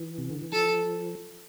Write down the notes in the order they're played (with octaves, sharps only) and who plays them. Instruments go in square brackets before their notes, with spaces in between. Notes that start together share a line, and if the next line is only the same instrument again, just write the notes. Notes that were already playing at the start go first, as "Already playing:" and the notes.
Already playing: [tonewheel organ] E3
C3
D3
E3
[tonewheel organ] F3 [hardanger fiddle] A4